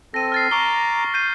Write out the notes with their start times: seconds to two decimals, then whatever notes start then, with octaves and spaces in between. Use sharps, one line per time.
0.14 C4 A4 A#6 D#7
0.32 F6 A6 C7
0.51 A#5 C#6 D6 G7
1.14 G6 C7 D#7